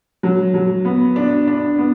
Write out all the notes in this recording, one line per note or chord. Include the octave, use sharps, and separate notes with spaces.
F#3
F#3
B3
D4
D4
B3